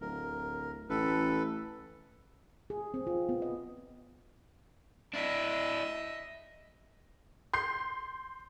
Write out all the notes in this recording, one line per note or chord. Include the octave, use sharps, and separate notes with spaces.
D1 A#4
A1 A4 B4
G#4
C4
F4
B3
D#5
D4 E4 D#5 E5
C6 G6 C7